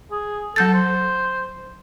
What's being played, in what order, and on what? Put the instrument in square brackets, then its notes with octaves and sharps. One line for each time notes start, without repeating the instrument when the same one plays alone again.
[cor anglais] G#4
[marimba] F#3 G6 A6 [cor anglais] A4
[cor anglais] C5